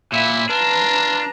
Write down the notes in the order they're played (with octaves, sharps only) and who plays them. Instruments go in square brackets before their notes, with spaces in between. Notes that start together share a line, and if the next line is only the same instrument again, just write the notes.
[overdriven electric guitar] A#2 [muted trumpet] E4 [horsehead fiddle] E5 B5
[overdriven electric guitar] D4 [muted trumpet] F4 [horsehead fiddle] B4 A#5